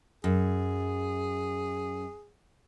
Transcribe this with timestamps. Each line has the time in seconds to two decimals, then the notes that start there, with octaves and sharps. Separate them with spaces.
0.24 F#2 G#4